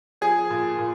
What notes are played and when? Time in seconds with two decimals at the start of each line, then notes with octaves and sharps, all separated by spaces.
0.21 F3 G#4
0.50 A#2
0.79 A#2